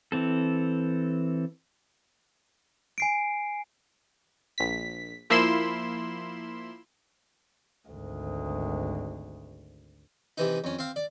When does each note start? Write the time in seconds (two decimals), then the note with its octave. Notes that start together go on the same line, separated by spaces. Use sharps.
0.12 E3 C4 A4
2.98 G#5 C7 D7
4.58 A#1 B6
5.30 F3 A#3 E4 B5 C6 E7
7.89 G#1 D2
10.38 C3 E3 D#4
10.64 F2 C#4
10.79 C4 F5
10.96 D5